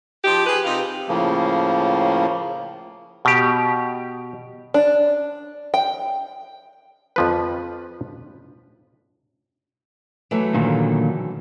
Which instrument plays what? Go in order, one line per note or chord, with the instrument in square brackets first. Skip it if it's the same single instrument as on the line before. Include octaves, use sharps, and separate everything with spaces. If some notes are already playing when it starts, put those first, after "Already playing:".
[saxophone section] F3 D#4 G4
G#4 B4
C3 D#4 F4
[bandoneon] A2 C#3 F3 A#3
[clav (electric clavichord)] B2 G4
[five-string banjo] D4
G5
[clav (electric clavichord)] F2 F3 B4
[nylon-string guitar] E3 F#3 A3
[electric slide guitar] A#2 D3 D#3